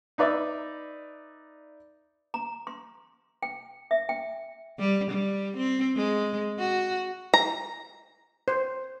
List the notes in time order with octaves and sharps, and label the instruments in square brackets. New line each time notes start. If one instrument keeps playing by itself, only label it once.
[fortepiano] D#4 B4 D5 E5
[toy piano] A#5
C6
G5
E5
G5
[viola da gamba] G3
G3
C4
G#3
F#4
[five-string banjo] A#5
[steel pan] C5